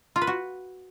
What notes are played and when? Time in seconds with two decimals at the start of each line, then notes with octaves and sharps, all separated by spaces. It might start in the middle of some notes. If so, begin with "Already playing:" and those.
0.16 F4
0.21 B4
0.27 F#4